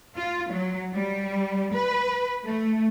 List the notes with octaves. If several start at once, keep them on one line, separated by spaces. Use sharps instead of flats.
F4
F#3
G3
B4
A3